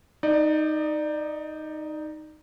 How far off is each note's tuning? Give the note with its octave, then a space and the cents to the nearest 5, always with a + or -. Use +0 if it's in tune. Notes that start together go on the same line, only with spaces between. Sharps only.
D#4 +0 D5 +25